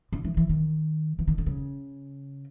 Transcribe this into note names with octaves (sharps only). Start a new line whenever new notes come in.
D3
E3
E3
D#3
E3
D#3
D3
C#3